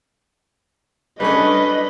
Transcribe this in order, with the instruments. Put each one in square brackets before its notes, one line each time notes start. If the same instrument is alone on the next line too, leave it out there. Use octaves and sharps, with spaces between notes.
[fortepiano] G3 A3 C#4 [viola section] D4 [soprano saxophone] B4 [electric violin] D#5